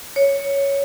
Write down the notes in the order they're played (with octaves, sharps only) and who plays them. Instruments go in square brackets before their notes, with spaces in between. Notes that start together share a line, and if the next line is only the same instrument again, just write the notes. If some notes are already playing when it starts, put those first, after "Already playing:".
[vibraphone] C#5